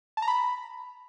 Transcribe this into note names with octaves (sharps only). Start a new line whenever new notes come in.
A5
A#5
B5